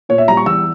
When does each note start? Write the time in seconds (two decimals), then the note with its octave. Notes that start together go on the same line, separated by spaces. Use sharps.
0.09 A#2 C#5
0.18 E5
0.28 G3 A#5
0.37 C#6
0.46 E2 E6